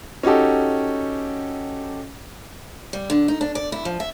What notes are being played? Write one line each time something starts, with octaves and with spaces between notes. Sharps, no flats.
C#4 D#4 F#4 G4 A4
G3
D3
D#4
D4
D5
E4
F3
E5